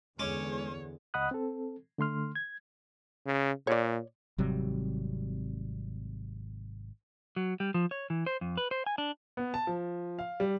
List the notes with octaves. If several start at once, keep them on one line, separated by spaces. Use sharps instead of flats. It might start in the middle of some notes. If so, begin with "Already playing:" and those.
E2 D3 G#3 C#4 C#5 D6
C#2 D#5 F#5 B5 D#6 F#6
C4 A4
D3 A3 C6 F6
G#6
C#3
A#2 C#5 D5
G#1 C3 F#3 G3
F#3
G3
F3
C#5
E3
C5
F2
B4
C5
G#5
D4
B3
A5
F3
F5
G3